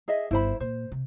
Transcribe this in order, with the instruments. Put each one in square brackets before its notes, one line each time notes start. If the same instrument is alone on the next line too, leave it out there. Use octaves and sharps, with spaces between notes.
[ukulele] G#4 D#5 E5
[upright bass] G1 [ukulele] E4 C5 B5
[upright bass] A#2 [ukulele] C5
[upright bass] C3